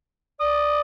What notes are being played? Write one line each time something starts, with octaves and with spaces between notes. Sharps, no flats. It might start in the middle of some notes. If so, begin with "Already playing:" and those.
D5 D#6